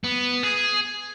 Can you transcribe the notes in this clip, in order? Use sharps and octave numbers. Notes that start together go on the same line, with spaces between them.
B3
G#4